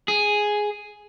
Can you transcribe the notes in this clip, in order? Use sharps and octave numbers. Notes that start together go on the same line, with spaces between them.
G#4